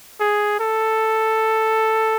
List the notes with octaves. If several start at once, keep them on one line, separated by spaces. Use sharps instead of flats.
G#4
A4